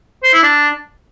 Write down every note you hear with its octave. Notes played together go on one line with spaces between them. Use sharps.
C5
E4
D4